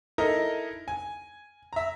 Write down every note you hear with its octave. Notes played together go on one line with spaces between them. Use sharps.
D#4 E4 A4 A#4 D#5
G#5
E5 A#5